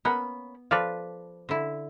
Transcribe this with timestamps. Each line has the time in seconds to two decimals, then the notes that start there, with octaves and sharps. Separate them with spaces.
0.05 A#3 B3 C#4 B5
0.71 F3 A4 B4 D5 F5
1.49 D3 E4